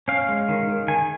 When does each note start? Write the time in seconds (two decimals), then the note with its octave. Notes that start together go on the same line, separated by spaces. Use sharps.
0.08 C#4 F5
0.29 G#3
0.49 D#3
0.69 D#3
0.88 D#3 G#5